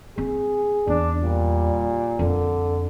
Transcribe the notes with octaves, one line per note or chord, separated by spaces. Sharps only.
C4 G#4
E2 D4
A#2 G3
F2 D3